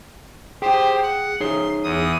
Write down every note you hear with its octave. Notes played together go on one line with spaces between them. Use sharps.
G4 G#4 C5 G5
F#5
D#4 G#4 C#5 C6
E2 D#6